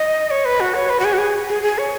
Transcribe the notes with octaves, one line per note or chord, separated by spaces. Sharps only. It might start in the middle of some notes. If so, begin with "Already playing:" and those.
Already playing: D#5
C#5
B4
F#4
C#5
B4
F#4
G#4
F#4
G#4
G#4
G#4
C#5